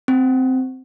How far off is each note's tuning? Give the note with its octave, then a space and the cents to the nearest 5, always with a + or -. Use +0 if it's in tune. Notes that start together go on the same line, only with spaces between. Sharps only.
C4 -10